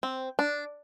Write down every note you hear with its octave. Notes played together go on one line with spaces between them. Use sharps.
C4
D4